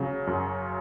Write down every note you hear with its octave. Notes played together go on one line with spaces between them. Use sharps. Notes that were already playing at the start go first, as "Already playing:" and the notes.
Already playing: C#3 F#3
F#2